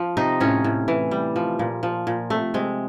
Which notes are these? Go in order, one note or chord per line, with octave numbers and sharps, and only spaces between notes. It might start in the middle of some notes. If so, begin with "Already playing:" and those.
Already playing: F3
C3 D#4
A2 C#4
A2
E3
G3
F3
A#2
F3
A#2
C3 A3
C3 G#3